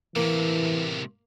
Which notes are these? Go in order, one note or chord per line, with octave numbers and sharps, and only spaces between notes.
A2 C3 E3 A#3